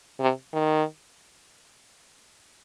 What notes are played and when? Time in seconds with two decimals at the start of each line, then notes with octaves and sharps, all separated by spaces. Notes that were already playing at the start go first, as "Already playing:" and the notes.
0.20 C3
0.53 D#3